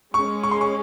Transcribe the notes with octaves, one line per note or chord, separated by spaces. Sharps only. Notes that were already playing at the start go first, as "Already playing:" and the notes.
G#3 C#4 G#4 C#6
C#6
C6
C#6